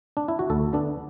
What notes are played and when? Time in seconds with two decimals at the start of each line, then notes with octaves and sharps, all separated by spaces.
0.17 D4
0.28 E4
0.39 F#4
0.50 D2 A4
0.73 D3 B3 D4